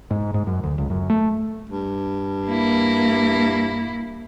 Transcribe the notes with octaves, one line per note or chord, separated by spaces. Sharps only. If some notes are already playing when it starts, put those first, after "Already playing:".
G#2
G#2
F#2
D2
C#2
F#2
A3
G2
A#3 E4